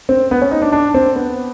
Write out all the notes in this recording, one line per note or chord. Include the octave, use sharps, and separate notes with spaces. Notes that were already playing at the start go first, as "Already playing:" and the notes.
C4
B3
C#4
D#4
D4
D4
C4
B3